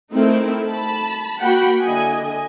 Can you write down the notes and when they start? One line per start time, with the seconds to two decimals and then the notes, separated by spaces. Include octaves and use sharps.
0.13 A3 C4 D#4 E4 A#4
0.68 A5 B5
1.41 A#3 F#4 F#5 G5 B5
1.83 D3 E4 D#5 G#5